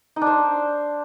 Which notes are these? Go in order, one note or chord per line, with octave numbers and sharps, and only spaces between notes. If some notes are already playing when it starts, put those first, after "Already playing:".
D#4
D4
C5